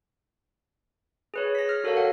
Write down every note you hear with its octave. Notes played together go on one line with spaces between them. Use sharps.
G#4 B4 C#5
A#6 B6
F6
F#4 A4 A#4 C#5 F5
F#5